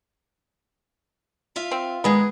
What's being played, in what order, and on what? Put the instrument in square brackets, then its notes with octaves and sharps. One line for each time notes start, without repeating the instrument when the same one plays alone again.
[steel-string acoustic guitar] F4 E5 F5
[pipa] C4
[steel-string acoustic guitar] D#3 G#3 [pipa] B3 G#4